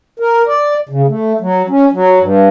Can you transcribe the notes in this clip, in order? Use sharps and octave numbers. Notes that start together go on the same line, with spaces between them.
A#4
D5
C#3
A3
F#3
C#4
F#3
G2